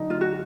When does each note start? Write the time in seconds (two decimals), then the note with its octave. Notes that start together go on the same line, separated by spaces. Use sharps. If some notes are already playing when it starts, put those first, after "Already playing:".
Already playing: D3 F#3 D4 D#4
0.10 F4
0.21 F#4